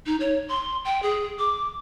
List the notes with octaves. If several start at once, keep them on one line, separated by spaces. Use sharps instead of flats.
D#4
C#5
C6
G5
G#4
D6